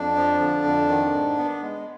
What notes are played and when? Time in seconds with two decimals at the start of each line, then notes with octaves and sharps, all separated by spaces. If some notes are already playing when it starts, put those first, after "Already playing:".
Already playing: F2 D4
0.16 F3
0.40 D3
0.64 F2
0.88 D#3
1.13 G#2
1.38 B3
1.62 G#3